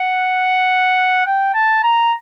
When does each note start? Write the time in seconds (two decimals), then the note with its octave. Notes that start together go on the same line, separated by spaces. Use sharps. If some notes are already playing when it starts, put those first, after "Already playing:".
Already playing: F#5
1.26 G5
1.54 A5
1.83 A#5